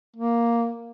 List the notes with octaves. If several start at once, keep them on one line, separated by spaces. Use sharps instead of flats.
A#3